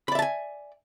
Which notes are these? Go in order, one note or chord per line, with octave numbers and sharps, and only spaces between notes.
D5 E5 G#5 A5 B5